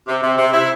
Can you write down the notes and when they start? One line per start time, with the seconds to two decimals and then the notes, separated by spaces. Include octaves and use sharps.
0.08 C3
0.23 C3
0.38 C3
0.53 E4